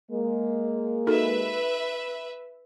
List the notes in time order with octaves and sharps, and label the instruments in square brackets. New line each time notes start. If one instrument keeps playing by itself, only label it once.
[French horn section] G#3 A#3
[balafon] D#4 F#4 A4 [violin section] B4 E5